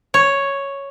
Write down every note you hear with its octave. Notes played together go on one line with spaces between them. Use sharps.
C#5